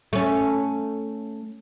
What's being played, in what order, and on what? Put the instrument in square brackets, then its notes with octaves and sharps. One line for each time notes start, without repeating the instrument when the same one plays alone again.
[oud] A3 C#4